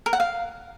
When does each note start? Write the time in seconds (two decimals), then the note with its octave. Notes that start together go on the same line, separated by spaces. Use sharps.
0.06 A#4
0.13 F#5
0.20 F5